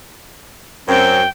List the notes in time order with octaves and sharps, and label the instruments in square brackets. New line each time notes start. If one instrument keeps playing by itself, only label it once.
[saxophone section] F#2 C4 [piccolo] G5